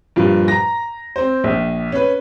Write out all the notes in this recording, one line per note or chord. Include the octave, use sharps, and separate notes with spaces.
G2 A#2 F3
A#5 A#6
C4 C5
A#1
C#4 B4